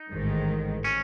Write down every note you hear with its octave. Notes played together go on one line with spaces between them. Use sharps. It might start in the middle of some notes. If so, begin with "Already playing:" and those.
Already playing: D#4
A1 G#2 D#3
C#4